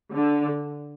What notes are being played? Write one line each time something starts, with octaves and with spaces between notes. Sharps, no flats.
D3